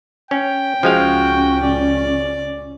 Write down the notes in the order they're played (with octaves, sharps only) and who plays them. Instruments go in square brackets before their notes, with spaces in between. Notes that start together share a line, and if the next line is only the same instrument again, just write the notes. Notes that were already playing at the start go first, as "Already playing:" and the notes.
[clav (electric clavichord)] C#4 [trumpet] G5
[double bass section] C#2 C#4 [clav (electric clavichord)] F3 G#3 F5 [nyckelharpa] F#4
[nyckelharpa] D5